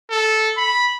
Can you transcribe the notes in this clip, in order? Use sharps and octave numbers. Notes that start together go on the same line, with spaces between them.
A4
B5